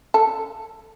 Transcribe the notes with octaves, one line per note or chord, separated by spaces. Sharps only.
A4